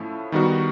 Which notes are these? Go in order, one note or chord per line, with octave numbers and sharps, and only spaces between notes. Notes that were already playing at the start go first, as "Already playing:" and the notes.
Already playing: A2 F3 A3 C#4 E4
D#3 G3 B3 D#4 F#4